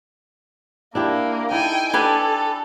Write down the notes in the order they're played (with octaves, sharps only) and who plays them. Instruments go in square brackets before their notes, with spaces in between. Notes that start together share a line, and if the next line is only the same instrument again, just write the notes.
[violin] A#3 [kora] D4 E4 G4
[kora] D#4 E4 A4 [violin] G5 G#5
[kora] D4 [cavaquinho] G4 B4 G#5 [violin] A4